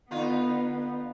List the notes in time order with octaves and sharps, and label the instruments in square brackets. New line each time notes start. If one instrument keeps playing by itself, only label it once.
[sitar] D3 D#4 F4 [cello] B3